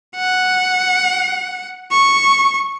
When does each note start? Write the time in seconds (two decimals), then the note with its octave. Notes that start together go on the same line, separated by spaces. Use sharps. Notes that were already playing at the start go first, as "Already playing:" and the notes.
0.16 F#5
1.91 C#6